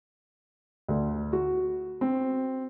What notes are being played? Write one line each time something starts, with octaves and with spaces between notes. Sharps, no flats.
D2
F#4
C4